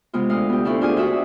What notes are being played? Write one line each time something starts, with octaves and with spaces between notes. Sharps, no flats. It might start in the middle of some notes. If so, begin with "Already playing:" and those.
C3 G#3 B3 F4
D2 F5 D#6
B3 G4
D2 C4 E4 A4 F5 C#6
D4 F4 G4 G#4 F5 G#5
F4 F#4 E5 D#6 E6